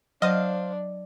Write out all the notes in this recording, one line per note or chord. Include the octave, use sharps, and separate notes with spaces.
F#3 D4 C5 D#5 F5